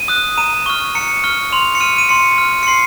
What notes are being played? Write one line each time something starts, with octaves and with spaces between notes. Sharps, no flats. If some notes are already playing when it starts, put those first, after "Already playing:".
Already playing: D#7
D#6 F#6
A#5 D#7
C#6 F6
A#5 C#7
C#6 F6
C6 F7
C#7
F6 D#7
D#7
C6 C#7
F6
C#7
C6 C7